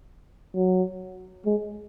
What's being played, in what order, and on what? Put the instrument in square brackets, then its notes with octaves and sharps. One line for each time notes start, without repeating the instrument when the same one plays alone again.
[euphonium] F#3
G#3